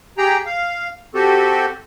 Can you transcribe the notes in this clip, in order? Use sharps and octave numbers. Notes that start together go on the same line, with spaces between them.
G4 G#4 G5 A#5
F5
C4 F#4 G4 A4